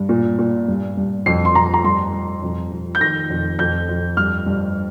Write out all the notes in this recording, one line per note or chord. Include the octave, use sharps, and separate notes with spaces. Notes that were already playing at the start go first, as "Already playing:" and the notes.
Already playing: G2
A#2
A#2
G2
G2
F2 C7
C6
F2 A#5
A#5
G2 C6
G2
F2
F2
G6
D#3 A#6
F2
F2 G6
F2
G2 F6
G2